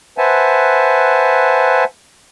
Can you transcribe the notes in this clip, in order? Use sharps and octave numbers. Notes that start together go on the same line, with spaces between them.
B4 C5 E5 F#5 G#5 A5